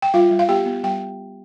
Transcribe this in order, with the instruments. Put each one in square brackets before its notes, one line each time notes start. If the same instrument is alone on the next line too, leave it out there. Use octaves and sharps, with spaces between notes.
[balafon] G5
G3 F4 F5
G3
F5
B3 G4 G5
B3
G3 G5